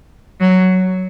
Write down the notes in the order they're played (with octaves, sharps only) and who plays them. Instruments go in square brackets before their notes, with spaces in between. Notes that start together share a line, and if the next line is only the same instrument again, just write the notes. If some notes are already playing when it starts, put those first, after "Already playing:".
[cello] F#3